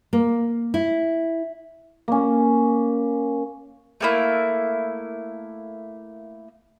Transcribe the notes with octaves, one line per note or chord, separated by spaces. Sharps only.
A#3
E4
A#3 C#4
A3 A#3 E4